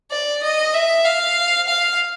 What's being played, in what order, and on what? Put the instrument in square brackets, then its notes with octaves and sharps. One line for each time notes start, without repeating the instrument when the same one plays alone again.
[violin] D5
D#5
E5
F5
F5